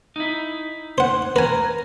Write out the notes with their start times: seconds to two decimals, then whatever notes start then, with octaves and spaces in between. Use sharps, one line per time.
0.16 D#4 E4
0.98 C5 F#5
1.36 A#4 B4 G#5